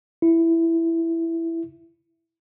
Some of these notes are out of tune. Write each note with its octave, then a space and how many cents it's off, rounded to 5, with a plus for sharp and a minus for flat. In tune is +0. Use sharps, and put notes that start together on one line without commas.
E4 +5